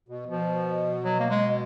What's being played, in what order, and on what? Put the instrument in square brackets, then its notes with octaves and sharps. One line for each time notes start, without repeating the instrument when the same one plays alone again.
[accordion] B2
[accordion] B2 [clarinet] F3
[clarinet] F#3
A#3
G#3